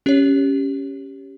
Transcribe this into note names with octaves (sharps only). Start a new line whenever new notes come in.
C#4 G4 C#5